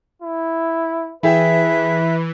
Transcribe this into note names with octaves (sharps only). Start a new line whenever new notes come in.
E4
E3 E4 G#4 B4 E5 G5